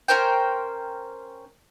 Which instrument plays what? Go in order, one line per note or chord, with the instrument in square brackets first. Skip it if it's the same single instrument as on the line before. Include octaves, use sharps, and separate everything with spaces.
[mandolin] C#4 A#4 C5 G5